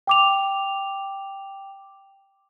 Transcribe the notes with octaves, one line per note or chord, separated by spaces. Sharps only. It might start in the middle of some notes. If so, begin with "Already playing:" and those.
G5 D6 F7